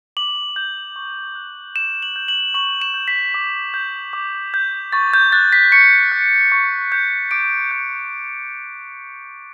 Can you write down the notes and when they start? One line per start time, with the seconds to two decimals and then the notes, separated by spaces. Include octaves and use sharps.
0.17 D6 F#7
0.56 G6
0.96 C#6
1.35 F#6
1.76 D6 E7
2.03 F#7
2.16 G6
2.28 F#7
2.54 C#6 F#7
2.82 E7
2.94 G6
3.08 B6
3.34 D6
3.74 G6
4.13 D6
4.54 G6
4.92 C#6 A6
5.14 G6
5.32 F#6 A6
5.53 B6
5.72 C#6 C#7
6.12 F#6
6.52 C#6
6.92 G6
7.31 D6 D7
7.71 G6